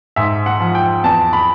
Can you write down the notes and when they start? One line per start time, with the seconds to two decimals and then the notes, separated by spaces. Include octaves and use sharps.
0.16 G#2 E5
0.46 F#5
0.60 F3
0.75 G5
1.04 E2 A5
1.33 B5